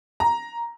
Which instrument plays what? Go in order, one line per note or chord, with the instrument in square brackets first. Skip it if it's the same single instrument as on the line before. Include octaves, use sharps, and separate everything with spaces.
[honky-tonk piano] A#5